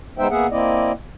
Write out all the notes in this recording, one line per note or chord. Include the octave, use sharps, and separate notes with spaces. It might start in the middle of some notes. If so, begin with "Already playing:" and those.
G#3 B3 D#4 C5 E5 G5
A#3 B3 G#4 E5 F#5
A#3 C4 E4 D5 D#5